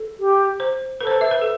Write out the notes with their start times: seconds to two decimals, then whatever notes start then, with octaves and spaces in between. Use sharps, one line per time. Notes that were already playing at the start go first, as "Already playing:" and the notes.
Already playing: A4
0.19 G4
0.60 C5
1.01 A4 B4
1.07 C5
1.11 B4
1.21 E5
1.31 B4
1.42 A4